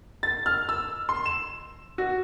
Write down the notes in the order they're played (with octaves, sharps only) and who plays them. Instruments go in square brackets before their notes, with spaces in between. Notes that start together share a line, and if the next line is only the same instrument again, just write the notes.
[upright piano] A6
F6
E6
C6
E7
F#4